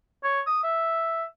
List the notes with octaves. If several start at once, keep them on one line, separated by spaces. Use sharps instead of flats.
C#5
D#6
E5